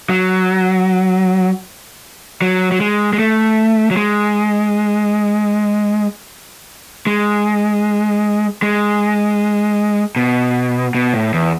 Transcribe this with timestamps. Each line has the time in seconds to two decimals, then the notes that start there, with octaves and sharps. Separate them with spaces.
0.09 F#3
2.42 F#3
2.72 F#3
2.81 G#3
3.13 G#3
3.19 A3
3.91 F#3
3.97 G#3
7.07 G#3
8.62 G#3
10.16 B2
10.95 B2
11.14 A2
11.34 E2